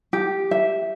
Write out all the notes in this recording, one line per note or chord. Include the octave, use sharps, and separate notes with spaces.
G4
E5